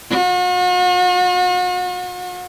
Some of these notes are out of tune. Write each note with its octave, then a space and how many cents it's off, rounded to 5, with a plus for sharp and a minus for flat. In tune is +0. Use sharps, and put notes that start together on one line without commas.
F#4 -45